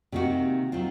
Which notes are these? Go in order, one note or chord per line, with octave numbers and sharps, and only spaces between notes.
C3 D#3 A#3 D#4 F#4
D#3 F#3 C4 F4